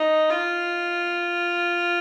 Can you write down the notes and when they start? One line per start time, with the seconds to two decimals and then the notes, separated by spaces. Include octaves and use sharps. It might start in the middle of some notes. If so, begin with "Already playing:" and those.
Already playing: D#4
0.30 F4